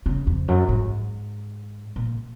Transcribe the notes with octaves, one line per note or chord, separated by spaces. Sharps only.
C#3
F2
F#2
G#2
A#2